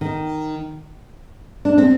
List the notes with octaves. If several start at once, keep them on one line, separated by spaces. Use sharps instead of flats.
D#3
D4
C4